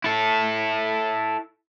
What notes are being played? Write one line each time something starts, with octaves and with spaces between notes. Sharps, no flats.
E4 A4